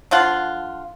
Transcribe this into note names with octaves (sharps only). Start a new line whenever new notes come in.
D3 F3 F4 F#5